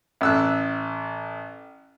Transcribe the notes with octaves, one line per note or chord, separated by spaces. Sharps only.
A1 E6 F#6